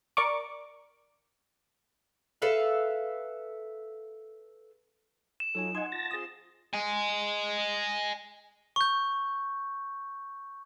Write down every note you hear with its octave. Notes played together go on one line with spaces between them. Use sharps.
A#4 D5 C#6 D6
A4 B4 E5 F5
E7
F#3 D#4 F4 A4 C#5 G#5
D#5 F#5 G#5 C6
F4 A5 A6 A#6
C4 F4 G#4 C6 D#6
D#5 G#5
C#6 G6